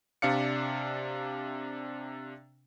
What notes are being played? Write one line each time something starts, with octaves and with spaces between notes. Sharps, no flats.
C3 D4 D5 F5 C#7